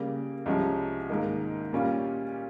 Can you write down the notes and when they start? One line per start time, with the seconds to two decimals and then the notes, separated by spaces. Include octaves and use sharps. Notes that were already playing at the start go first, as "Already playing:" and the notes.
Already playing: C#3 G3 A#3
0.46 C2 C3 F3 G#3 C#4
1.09 G#2 D#3 A#3 D#4
1.72 A#2 G3 A#3 C#4 F4